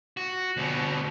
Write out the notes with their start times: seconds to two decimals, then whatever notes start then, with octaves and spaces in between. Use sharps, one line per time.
0.17 F#4
0.57 D2 B2